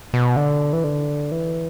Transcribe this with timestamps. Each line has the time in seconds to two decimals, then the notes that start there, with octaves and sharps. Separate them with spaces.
0.14 B2
0.36 D3
0.73 E3
0.84 D3
1.31 E3